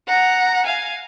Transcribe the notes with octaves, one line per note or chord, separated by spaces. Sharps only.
F#5 A#5
F5 G#5